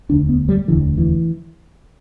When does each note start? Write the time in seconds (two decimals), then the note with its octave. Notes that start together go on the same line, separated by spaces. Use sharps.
0.09 E1 D2 D3 D4
0.29 B3
0.49 G3
0.68 E1 D2 D3 E3
0.98 E3